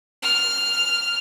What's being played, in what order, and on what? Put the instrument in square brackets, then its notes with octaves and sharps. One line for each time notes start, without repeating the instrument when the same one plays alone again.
[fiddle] F6